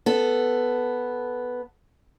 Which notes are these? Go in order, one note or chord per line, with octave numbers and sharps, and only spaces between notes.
B3 A4